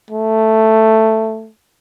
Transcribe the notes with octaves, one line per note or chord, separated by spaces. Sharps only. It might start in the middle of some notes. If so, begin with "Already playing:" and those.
A3